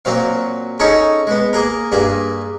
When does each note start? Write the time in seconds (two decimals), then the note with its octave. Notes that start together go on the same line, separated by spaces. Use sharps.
0.05 A#2 F#3 C4 F5
0.80 C#4 D#4 G#4 A4 C#5
1.27 G#3 B3
1.53 A#3 G#4 A#4
1.92 G2 A#3 G#4